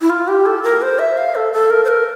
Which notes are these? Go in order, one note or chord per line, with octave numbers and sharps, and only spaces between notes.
E4
F4
G4
A4
A#4
C5
E5
F5
A4
A4
A#4
C5
A#4